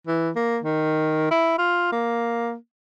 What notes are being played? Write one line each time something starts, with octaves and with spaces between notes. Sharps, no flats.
E3
A#3
D#3
E4
F4
A#3